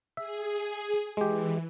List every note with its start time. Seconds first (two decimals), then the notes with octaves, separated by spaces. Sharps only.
0.17 G#4 E5
1.17 E3 G#3 G4